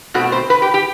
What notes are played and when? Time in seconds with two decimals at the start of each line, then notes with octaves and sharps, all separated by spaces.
0.14 B2 A3 C4 F#4
0.32 C5
0.50 B4
0.62 G4
0.74 G4